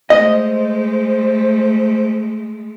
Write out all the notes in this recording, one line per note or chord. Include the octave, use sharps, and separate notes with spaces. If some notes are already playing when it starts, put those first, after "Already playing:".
G#3 A3 C5 D#5